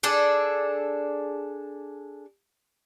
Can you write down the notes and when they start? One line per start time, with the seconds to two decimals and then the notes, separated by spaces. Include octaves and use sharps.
0.03 D4 G#4 A4 D5